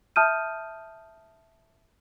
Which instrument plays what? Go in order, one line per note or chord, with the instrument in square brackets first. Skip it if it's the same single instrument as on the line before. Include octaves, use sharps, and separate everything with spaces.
[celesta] E5 A5 D#6 F6 G6 D#7